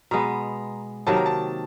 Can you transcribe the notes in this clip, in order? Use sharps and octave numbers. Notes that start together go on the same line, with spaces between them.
B2 G#3 B3 A#5
C3 D#3 F#3 A#3 A5
A#5
A5